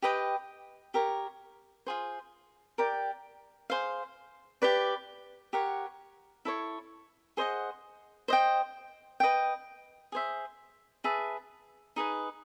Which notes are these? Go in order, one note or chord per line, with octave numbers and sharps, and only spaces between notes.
G4 B4 D#5 G5
G4 A#4 C#5
F4 G#4 C5
G4 A#4 D5 G5
G#4 C5 F5
G4 B4 D5
G4 A#4 C#5 F#5
E4 A4 C#5
G#4 C5 D#5 F#5
C5 D#5 G5
B4 D#5 G5
G#4 C5 E5
G#4 B4 E5 A5
D#4 G#4 B4